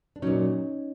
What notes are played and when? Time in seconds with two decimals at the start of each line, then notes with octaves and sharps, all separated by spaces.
0.16 D4
0.22 A#2 F#3 C#4 D#4